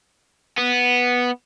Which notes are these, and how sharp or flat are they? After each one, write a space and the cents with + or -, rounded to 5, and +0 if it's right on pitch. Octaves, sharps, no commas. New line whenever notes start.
B3 -5